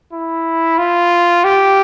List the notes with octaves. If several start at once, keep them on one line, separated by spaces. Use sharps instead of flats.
E4
F4
G4